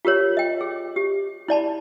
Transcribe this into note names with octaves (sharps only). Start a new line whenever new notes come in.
F4 G4 A#4 C#5
D#5 G5
G#4
G4
E4 D5 A5 B5